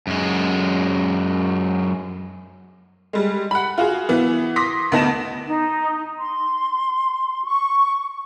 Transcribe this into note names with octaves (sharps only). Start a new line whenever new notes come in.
F#2 G#3
G3 G#3
F#5 B5
F4 F#4 G#4
E3 B3
C6 D6 D#6 A#6 B6
D2 B3 D#4 A5 A#6 E7
D#4
C6
C#6